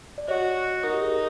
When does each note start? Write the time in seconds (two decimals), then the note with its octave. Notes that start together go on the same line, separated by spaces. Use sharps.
0.18 D5
0.28 F#4 C#5 D#5
0.83 D#4 A#4
0.93 G4
1.02 G#4